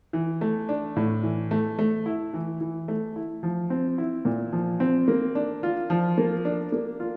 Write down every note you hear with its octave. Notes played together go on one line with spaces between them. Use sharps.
E3
A3
D4
A2
E3
A3
A3
E4
E3
E3
A3
E4
F3
C4
E4
A#2
F3
C4
A#3
D4
F4
F3
A#3
D4
A#3
F4